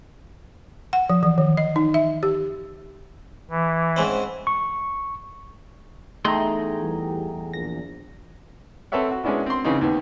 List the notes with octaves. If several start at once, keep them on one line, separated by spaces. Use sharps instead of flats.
F#5
F3
E3
D#3
D#5
D#4
E5
G4
E3
G#2 C4 C#4
C#6
E2 A3 D#4 G#4 G5 A#5 C6
E3 G3
A#1 A#6
C4 A4 B4 C#5 E5 F#5
F#4
G#3 B3 C#4 D4 E4 F#4
C4 C6
C#3 E3 C4 C#4 D#4
D#2 D#3 B3